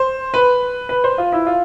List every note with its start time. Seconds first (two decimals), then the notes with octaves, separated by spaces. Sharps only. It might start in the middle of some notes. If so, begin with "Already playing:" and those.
Already playing: C5
0.34 B4
0.89 B4
1.04 C5
1.18 F4
1.32 E4
1.47 F4